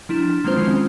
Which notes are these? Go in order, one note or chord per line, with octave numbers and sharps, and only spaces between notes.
F3 D4 E4
F3 G#3 C4 F4 C5
D#3 E3 C4 C#4